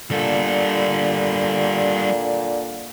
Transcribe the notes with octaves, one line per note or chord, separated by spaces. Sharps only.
A#2 D3 G3 A4